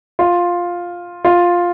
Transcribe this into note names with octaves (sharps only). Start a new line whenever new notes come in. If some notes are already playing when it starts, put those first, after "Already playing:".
F4
F4